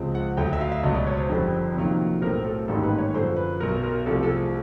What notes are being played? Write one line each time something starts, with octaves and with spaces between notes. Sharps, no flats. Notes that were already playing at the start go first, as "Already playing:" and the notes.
Already playing: C#2 C#3 F3 G#3 C4
F#5
D2 D3 F#3 G5
E5
F5
E5
C#2 B2 F#3 B3 D#5
D5
C#5
C5
F#1 F2 D3 G3 C4
F2 C3 D#3 F#3 A#3
B1 A2 F#3 A3 C4 A#4
A4
A1 G#2 D#3 G3 A#3 A4
B4
C#5
F#2 D3 F3 C5
B4
B1 B2 F#3 A#4
A#4
C2 C3 F3 A3 A4
A4
G#4